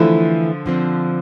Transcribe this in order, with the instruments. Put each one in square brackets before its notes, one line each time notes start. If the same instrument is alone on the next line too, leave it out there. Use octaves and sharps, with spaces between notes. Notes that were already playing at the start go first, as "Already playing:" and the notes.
Already playing: [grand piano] D3 F3 [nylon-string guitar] E3 A3 E4
[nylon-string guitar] D3 F3 C4